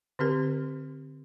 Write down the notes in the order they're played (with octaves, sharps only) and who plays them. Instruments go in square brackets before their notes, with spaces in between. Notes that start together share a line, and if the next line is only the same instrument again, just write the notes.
[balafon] D3 C4 G4 A#4